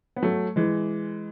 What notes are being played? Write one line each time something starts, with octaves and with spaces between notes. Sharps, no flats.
B3
F#3 A3
E3 G#3